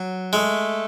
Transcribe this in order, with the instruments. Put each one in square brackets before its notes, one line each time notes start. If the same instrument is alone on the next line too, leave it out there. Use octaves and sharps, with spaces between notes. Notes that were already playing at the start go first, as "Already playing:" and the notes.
Already playing: [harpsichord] F#3
[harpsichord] G#3 [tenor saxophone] A3